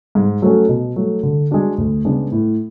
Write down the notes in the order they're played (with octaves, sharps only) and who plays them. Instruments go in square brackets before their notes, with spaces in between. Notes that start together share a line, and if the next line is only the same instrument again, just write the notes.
[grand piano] G#2
F#3 A3 C#4 F#4
B2
F#3 A3
D3
G#3 D4 F#4
D2
C#3 G#3 B3 D4
A2